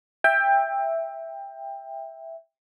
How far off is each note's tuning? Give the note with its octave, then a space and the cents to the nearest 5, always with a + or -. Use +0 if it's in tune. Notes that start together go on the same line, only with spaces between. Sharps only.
E5 +0 G5 +20